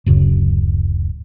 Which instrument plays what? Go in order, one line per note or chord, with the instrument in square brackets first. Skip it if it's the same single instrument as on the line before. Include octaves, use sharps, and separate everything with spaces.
[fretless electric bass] D1 F#2 C#3